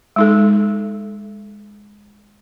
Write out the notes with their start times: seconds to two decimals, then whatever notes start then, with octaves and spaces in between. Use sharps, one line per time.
0.16 G#3 D#4 A4